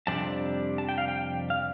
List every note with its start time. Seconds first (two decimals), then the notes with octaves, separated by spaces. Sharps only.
0.07 F2 C3 G3 D4 A5
0.78 A5
0.89 G5
0.98 F5
1.08 G5
1.50 F5